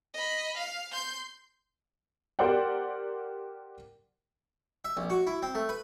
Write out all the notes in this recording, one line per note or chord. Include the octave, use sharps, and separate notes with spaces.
D#5 B5
F5
C6 G6
G4 A#4 C5 D5 F#5 G5
E5
A#1
F#4
E4
C4
A3
B4